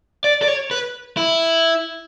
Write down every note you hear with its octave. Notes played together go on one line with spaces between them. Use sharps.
D5
D5
C#5
B4
E4